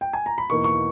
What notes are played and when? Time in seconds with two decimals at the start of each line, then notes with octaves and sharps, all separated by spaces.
0.01 G5
0.13 G#5
0.26 A#5
0.38 B5
0.50 E2 B2 A#3 D#4 C#6
0.64 C#6